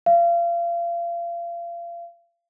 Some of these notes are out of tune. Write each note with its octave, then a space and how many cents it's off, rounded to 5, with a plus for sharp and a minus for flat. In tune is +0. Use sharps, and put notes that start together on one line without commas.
F5 -30